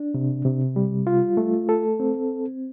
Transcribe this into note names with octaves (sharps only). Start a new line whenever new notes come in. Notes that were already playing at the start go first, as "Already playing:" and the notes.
Already playing: D4
C3
C3
G3
F4
A3
A4
C4